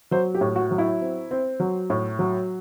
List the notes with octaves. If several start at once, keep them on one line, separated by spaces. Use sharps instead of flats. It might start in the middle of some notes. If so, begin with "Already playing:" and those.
F#3 C5
G4
A2
F#4
F#3
E4
C4
C4
F#3
A2
F#3